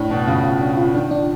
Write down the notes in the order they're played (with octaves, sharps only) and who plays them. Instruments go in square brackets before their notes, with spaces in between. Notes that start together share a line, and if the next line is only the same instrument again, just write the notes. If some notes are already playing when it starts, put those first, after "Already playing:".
Already playing: [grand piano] A2 [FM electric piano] D4
[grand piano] B2 [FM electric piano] D4
[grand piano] C#3 [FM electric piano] F4
[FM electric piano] F4
D4
F4
[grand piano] D#3 [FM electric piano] D4
[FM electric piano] D4